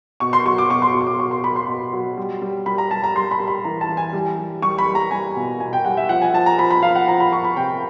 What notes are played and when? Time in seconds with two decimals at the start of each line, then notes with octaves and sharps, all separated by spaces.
0.20 B2 C#6
0.33 C6
0.46 F#3 C#6
0.58 D6
0.70 B2 C#6
0.82 C6
0.94 B2
1.01 C#6
1.07 D6
1.19 F#3 C#6
1.31 C6
1.43 F#3 B5
1.56 C6
1.68 B2
1.93 F#3
2.17 G3
2.42 G3
2.66 G3 B5
2.78 A#5
2.91 G3 A5
3.03 A#5
3.15 G3 C6
3.31 B5
3.40 G3
3.48 B5
3.64 E3 A#5
3.81 A5
3.89 E3
3.97 G#5
4.13 G3
4.38 G3
4.62 G3 C#6
4.78 B5
4.86 G3
4.95 A#5
5.11 G3 G#5
5.36 B2
5.60 B2 G#5
5.73 G5
5.85 G3 F#5
5.97 E5
6.09 F3 F#5
6.22 G#5
6.34 F3 A5
6.46 A#5
6.59 F3 B5
6.71 B5
6.82 F3 F5
6.95 F#5
7.07 F3 A#5
7.20 B5
7.32 F3 C#6
7.45 B5
7.56 C3 G5